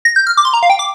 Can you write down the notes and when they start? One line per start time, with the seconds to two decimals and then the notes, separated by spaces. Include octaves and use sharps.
0.05 A#6
0.16 G6
0.27 F6
0.37 D6
0.45 C6
0.54 A#5
0.63 F5
0.70 G5
0.79 D6